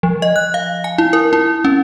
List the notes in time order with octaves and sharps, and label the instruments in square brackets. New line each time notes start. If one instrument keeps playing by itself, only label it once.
[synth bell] F3
D#5
F#6
F5
G#5
E4
A#4
E4
C#4